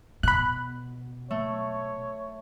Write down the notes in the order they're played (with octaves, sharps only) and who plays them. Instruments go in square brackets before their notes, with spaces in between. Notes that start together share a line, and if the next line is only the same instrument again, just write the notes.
[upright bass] B2 [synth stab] B5 F#6
[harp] A3 [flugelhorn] C#5